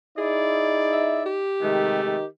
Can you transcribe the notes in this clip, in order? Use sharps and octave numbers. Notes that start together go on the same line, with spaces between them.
D#4 E4 G#4 D5
E5
G4
C3 D#3 G#3 A3
D#3